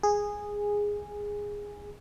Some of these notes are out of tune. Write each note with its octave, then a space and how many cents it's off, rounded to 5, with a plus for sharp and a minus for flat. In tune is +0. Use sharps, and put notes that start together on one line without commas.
G#4 -10